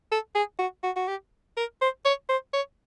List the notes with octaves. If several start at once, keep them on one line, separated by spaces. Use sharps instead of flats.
A4
G#4
F#4
F#4
F#4
G4
A#4
C5
C#5
C5
C#5